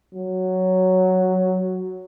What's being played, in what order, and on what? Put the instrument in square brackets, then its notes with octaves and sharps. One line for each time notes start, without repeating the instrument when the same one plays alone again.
[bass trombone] F#3